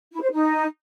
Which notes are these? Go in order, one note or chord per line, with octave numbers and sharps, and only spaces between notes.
E4
C5
D#4